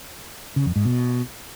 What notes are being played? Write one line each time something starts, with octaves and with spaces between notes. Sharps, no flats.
C#3
F2
G#2
B2